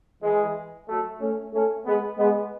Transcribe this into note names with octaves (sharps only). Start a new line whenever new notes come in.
E3 G#3
F#3 A3
A3 C#4
A3 C#4
G#3 B3
G#3 B3